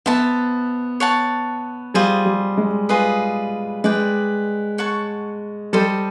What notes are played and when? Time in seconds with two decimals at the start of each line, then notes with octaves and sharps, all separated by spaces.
0.06 B3 C5 E5 A5
1.00 C#5 F#5 A5
1.94 G3 F4 G#4 C5 D#5
2.26 G3
2.57 G#3
2.89 F4 G#4 B4 D#5
3.84 G#3 B4 D5 G5
4.78 C#5 F#5 A5 C#6
5.73 G3 A4 C5 D#5 G5